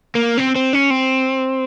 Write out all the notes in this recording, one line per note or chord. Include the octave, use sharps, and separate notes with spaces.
A#3
C4
C4
C#4
C4